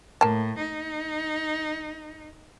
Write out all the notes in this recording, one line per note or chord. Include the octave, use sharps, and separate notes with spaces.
A2 A#3 A5
D#4